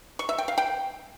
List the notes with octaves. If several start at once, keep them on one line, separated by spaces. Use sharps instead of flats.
C#6
E5
G5
F5
G5